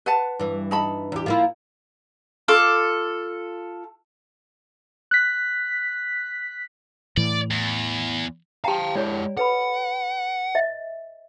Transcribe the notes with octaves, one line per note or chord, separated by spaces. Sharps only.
B4 F#5 A5
G2 E3
D#4 A5 B5
E2 G4
F3 A#3 E4
F4 A4 D6
F#6 B6
A2 E3 D5
E2
G4 F5 G5 A5 A#5
G#3 E4 C#5 D5
A4 B4 F#5 B5
D#5 E5